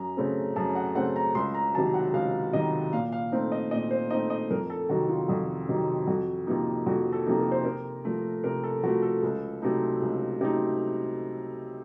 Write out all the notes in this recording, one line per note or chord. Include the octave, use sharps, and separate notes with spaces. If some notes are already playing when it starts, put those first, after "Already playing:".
Already playing: F#2 A#5
C#3 A3 C4
F#2 A5
F#5
C#3 A3 C4 F#5
A#5
C#2 C6
A#5
C3 D#3 F#3 A5
F#5
C#2 F5
C3 D#3 F#3 D#5
A#2 F5
F5
A3 C4 D#4
D#5
A#2 D#5
C5
A3 C4 D#4 D#5
D#5
F2 A#4
A4
C3 D#3 F#3 F#4
F4
F2 F#4
C3 D#3 F#3
F2 F#4
C3 F3 A#3 D#4
F2 F#4
A4
C3 F3 A#3 D#4
A#4
C5
C3 A#4
F3 A3
C3 A#4
A4
F3 A3 F#4
A4
C#2
C3 F#3 A3 D#4
C#2
C3 F#3 A3 D#4